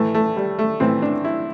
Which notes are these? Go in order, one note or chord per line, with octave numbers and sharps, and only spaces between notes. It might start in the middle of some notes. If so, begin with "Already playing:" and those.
Already playing: A2 E3 A3
A3
G3
A3
A2 E3 C4
D4
E4